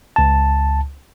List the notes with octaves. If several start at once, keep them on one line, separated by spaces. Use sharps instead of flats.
C#2 A5